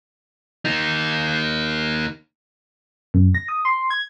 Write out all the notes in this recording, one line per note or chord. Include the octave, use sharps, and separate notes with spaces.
A#3 D#4
F#2
A#6
D#6
C6
G#6